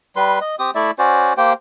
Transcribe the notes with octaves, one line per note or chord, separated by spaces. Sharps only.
G3 B4 C6
D#5
C4 G4 D#6
A3 E4 D5 E5
C#4 F#4 C5 D5
A#3 G4 C5 G5